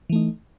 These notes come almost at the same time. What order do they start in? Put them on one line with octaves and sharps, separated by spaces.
E3 A3 D#4